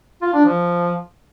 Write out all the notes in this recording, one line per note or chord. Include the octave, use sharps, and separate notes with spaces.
F4
D4
F3